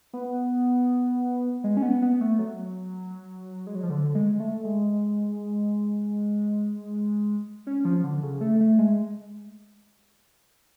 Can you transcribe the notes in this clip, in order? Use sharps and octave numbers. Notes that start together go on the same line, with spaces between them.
B3
G#3
C#4
B3
B3
A3
F#3
G#3
F#3
F3
D3
G#3
A3
G#3
C#4
F3
D3
C#3
A3
A3
G#3